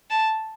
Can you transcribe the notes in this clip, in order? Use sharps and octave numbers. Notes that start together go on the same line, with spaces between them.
A5